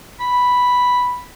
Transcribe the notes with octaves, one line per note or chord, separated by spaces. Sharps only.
B5